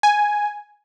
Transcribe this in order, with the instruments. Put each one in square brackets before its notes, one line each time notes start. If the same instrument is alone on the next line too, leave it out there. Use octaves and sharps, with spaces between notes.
[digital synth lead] G#5